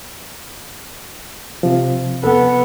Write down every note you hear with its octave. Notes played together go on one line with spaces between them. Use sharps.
C3 F3
B3 A4